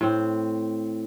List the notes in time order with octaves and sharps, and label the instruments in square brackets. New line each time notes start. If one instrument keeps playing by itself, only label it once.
[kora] A2 C4